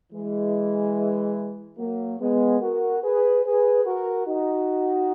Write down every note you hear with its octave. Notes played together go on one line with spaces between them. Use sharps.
E3 G#3
F#3 A#3
G#3 B3
F#4 A#4
G#4 B4
G#4 B4
F#4 A#4
D#4 F#4